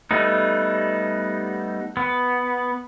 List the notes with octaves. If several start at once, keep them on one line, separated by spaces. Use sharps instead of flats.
G3 A3 B3 D#4
B3